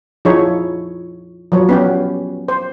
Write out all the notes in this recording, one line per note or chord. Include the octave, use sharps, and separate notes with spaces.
F3 D#4 E4 G#4 C#5
F3 F#3 C#5
B3 C#4 G4
C5